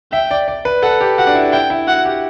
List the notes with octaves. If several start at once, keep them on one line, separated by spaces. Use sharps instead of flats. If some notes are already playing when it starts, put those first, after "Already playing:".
E5 G5
D5
D5
B4
A4 F#5
G4
F#4 F#5
D4
E4
E4 G5
E4
F#4 F#5
G4